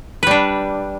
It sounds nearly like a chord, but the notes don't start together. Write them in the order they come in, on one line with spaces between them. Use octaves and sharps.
B4 G3 D4